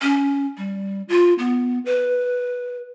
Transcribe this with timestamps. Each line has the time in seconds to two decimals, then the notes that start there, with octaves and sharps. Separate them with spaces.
0.02 C#4
0.57 G3
1.09 F4
1.39 B3
1.86 B4